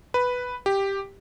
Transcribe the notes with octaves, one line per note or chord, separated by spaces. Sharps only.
B4
G4